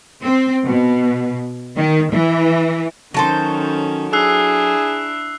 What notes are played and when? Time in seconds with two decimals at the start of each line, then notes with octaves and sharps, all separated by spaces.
0.22 C4
0.65 B2
1.76 D#3
2.11 E3
3.14 D#3 F#3 C#4 A4 C5
4.13 D4 E4 G#4 E6 F#6 C7